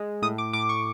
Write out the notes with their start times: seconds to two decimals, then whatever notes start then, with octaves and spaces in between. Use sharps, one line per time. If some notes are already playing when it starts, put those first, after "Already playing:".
Already playing: G#3
0.22 A2 D#6
0.38 D6
0.53 A2 D6
0.69 C#6